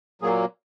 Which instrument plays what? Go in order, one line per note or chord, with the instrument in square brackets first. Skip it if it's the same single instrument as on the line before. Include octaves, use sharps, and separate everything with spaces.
[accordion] A#2 F#3 A#3 G#4